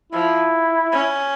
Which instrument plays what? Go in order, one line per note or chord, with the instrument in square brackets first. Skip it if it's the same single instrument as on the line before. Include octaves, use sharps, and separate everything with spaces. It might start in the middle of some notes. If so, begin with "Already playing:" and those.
[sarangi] F3 [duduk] E4
[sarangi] C#4